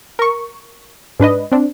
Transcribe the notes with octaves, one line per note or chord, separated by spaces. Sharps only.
A#4 C#6
G#2 D4 B4 D#5
C4 D4